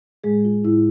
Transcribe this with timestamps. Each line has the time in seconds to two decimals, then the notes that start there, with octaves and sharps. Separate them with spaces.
0.24 A2 G#3 G#4
0.45 F4
0.64 A2 E4